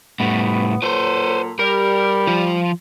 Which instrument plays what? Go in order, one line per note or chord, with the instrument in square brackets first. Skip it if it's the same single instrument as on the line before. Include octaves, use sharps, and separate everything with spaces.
[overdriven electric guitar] A2 G3 [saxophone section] B3
[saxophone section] A#2 F#3 A4 [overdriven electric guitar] B4 C5
[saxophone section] G3 [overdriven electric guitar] A#4
[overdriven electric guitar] F3 F4